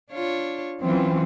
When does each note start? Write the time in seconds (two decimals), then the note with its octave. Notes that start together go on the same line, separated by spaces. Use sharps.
0.11 D4 F4 C#5
0.81 E3 F#3 C4 C#4 F4